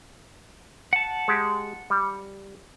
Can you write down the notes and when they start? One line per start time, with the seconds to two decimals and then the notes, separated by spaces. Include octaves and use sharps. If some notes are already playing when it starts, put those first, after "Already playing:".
0.93 F#5 A5
1.28 G#3 G4
1.90 G3